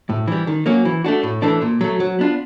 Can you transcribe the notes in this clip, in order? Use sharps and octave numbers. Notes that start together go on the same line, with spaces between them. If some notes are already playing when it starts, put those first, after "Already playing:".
A2
E3 G3
D#3
F#3 A#3 C#4
E3
A3 D4 F#4
A2
E3 A3 D4
A#2
F#3 A3
F#3
B3 D4 F4